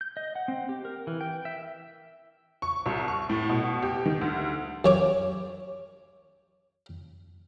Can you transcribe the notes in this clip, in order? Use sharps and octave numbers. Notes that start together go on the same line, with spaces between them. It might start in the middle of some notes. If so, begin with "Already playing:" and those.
G6
D#5
F#5
C4
G4
A#4
E3
G5
E5
C#6
C2
C#6
A2
B2
G4
D#3
D2
F#2 C#5 D6